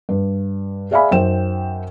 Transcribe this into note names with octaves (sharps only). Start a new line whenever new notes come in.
G2
G#4 D5 E5 F5 G#5 B5
F#2 D#4 C5 G5 E7